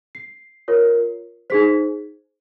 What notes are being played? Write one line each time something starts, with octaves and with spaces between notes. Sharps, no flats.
C7
F4 A#4 C#5
D#4 G#4 C5 B6